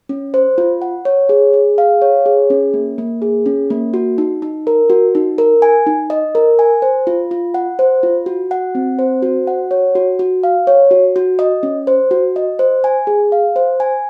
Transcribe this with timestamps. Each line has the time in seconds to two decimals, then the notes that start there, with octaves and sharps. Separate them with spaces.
0.09 C#4
0.34 C5
0.58 F4
0.82 F#5
1.05 C#5
1.29 G#4
1.54 G#4
1.78 F5
2.02 C#5
2.26 G#4
2.50 C#4
2.74 A#3
2.98 A#3
3.22 G#4
3.46 C#4
3.70 A#3
3.94 F#4
4.18 D#4
4.42 D#4
4.67 A#4
4.90 F#4
5.15 D#4
5.38 A#4
5.62 G#5
5.87 D#4
6.10 D#5
6.35 A#4
6.59 G#5
6.82 C5
7.07 F4
7.31 F4
7.54 F#5
7.79 C5
8.03 F4
8.26 F#4
8.51 F#5
8.75 C4
8.99 C5
9.23 F#4
9.47 F#5
9.71 C#5
9.95 F#4
10.19 F#4
10.44 F5
10.67 C#5
10.91 F#4
11.16 F#4
11.39 D#5
11.63 C#4
11.87 C5
12.11 F#4
12.36 D#5
12.59 C5
12.84 G#5
13.07 G#4
13.32 F5
13.56 C5
13.80 G#5